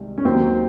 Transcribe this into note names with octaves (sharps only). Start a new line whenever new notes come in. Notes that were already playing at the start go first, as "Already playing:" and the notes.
Already playing: C2 C3 D#3 G#3
C#4
D#2 D#3 F#3 C4